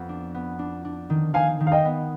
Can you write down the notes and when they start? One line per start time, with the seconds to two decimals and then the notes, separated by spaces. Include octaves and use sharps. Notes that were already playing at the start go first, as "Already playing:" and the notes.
Already playing: F2 B3
0.09 D4
0.34 B3
0.59 D4
0.85 D4
1.10 D#3
1.34 D#3 F5 G#5
1.60 D#3
1.67 F5
1.72 D#5 G5
1.85 B3